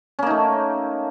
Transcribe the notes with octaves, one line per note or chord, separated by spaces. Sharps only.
A3 A#3 C#4 D#4